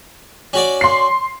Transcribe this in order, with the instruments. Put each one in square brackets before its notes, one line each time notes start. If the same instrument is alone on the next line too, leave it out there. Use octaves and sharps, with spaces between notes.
[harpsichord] C#4 F#4 D5
[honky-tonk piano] C6 C7